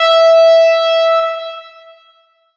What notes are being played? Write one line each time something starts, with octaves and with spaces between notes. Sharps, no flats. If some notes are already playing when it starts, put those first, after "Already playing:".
Already playing: E5